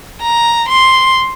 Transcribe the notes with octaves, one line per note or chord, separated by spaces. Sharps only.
A#5
C6